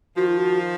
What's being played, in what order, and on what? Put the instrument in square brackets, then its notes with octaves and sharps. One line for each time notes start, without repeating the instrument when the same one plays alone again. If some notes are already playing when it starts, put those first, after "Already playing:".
[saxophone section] D#3 F3 [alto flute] F#4
[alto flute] F4
F#4